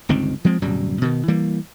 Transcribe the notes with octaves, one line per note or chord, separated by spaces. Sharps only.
G1 C#2 D#3 C4
F3 G#3 C4
D1 F#2 B2 G3
B2 D#3
E3 G3 A#3